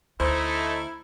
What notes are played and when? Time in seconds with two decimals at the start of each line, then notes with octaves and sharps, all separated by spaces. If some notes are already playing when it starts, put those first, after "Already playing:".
0.20 D2 A3 D#4 E4 C5